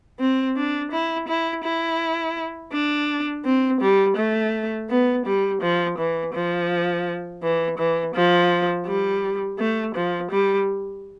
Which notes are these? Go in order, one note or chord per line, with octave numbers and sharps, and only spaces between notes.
C4
D4
E4
E4
E4
D4
C4
G3
A3
B3
G3
F3
E3
F3
E3
E3
F3
G3
A3
F3
G3